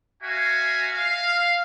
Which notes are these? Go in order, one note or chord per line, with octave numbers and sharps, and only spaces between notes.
F#4 E5 F5 G#5 A#5
F5